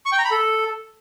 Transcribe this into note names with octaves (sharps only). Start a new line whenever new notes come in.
C#6
G5
A#5
B5
A4